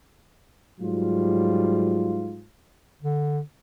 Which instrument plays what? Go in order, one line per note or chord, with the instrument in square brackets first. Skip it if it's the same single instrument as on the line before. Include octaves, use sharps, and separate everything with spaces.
[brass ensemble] G#2 F#3 G3 F4
[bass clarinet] D3